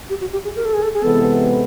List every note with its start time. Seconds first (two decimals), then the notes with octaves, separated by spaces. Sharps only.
0.09 G4
0.21 F#4
0.32 G4
0.44 G#4
0.56 A#4
0.65 A4
0.74 G#4
0.82 A4
0.93 G#4
1.02 C3 E3 G#3 B3 A4